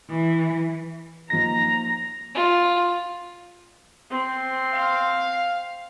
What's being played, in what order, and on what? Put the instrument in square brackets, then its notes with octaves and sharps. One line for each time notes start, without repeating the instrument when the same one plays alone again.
[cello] E3
[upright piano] F3 A#3 D#4 [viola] A#5 [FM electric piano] A#6
[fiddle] F4
[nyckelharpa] C4
[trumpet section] F5